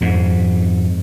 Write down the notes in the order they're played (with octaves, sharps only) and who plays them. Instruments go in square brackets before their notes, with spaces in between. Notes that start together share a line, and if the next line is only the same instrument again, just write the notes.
[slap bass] F2 G#2